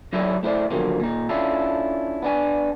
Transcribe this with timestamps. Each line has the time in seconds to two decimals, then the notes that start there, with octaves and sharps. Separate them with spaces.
0.13 F#3 D#4 E4 G4 C#5 D5
0.43 A3 E4 C5 D5
0.71 B2 D3 D#3 F3 F#3 A#3
1.00 A#2 D#4
1.29 C#4 D4 E4 F4 A4
2.22 B3 D4 G#5